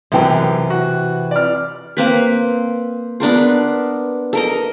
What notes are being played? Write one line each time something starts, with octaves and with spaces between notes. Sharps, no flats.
B1 F#2 C3 E3 G5
F#4
D5 F6
A#3 C4 B4
B3 D4 A#4 C6
A4 A#4 D#5